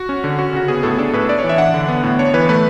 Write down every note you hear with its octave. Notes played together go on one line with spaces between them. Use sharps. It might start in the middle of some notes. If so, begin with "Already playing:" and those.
Already playing: F#4
C#4
D3
C#4 F#4
C#3 F#4
B3 G#4
A2 A4
D4 A4
A2 B4
D4 D5
C#5
E3
E5
D4 F#5
D3
B3
A2
D4 C#5
E3 B4
A3 B4